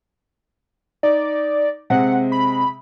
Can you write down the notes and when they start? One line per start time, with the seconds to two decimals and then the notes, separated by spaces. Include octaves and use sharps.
1.03 D#4 D5
1.90 C3 G#3 C4 F#5
2.32 B5